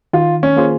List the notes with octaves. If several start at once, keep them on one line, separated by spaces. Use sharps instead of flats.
D#3 F4
C#4
A#3 F4 G#4 C5